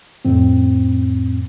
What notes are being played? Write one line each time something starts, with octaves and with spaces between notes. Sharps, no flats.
F2 A2 C4